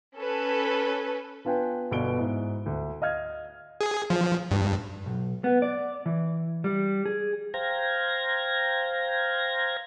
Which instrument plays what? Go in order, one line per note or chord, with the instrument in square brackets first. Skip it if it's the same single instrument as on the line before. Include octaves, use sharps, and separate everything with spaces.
[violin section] C#4 A4 B4
[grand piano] B3 D4 F4 B4 G5 G#5
G1 B2 D5 D7 G7
G#2 E4
D2
D#5 F5 F6 G#6
[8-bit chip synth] G#4
F3
G2
[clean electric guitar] B1
B3
D5
E3
G3
G#4
[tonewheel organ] C5 F5 G5 A#5 G#6 A#6